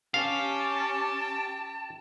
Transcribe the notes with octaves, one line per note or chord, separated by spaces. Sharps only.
C#4 G4 F5 A5